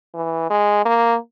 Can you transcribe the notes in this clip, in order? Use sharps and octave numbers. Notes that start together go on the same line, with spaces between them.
E3
G#3
A#3